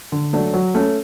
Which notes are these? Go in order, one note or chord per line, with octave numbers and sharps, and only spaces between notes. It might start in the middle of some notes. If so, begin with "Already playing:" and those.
D3
F#3 A3 D4
F#3
A3 C#4